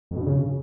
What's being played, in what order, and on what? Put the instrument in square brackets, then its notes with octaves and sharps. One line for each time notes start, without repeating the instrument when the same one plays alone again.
[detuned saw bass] F2
B2
G2
C#3